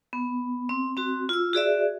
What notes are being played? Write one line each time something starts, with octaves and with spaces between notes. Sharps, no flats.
B3
C4
C4 F#4
F4 E6
F#4 G#4 D5 E5